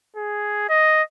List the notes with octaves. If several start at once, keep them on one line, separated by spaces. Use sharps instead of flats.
G#4
D#5